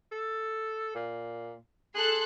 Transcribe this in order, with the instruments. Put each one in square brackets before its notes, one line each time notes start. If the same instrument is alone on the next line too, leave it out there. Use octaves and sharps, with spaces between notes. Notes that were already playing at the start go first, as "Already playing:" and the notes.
[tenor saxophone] A4
A#2
[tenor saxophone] G#4 [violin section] A4 C6 F#6